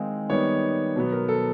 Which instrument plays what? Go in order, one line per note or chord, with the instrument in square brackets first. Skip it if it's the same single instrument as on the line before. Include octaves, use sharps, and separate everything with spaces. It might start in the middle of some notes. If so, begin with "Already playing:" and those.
Already playing: [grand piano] D#3 G#3 C4 D#4 F5
D#3 G3 B3 D#4 C#5
B2 F#3 B3
A#4
A4